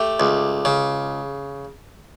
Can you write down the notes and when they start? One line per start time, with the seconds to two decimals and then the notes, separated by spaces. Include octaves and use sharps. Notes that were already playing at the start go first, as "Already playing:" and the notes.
Already playing: A3 G4
0.20 C#2
0.65 C#3